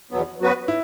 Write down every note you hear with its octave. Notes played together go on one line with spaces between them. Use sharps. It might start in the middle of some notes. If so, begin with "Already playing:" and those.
E2 B2 F#3 B3
F#2 F#3 B3 F#4 B4
E4